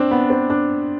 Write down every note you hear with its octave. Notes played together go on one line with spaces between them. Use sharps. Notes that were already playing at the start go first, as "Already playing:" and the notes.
Already playing: C4 D4
B3
C4
D4